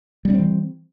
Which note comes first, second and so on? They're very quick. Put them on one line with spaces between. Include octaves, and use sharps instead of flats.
G3 C#4 C4 E3